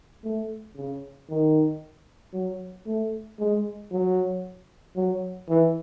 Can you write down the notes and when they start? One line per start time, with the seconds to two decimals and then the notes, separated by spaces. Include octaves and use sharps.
0.24 A3
0.76 C#3
1.29 D#3
2.33 F#3
2.86 A3
3.39 G#3
3.91 F#3
4.96 F#3
5.49 E3